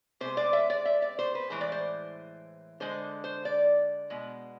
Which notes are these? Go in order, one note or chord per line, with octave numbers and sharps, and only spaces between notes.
C3 G#3 C5
D5
E5
D5
E5
D5
C5
B4
A2 E3 G#3 C5
D5
C5
D3 G#3 C5
C5
D5
B2 G#3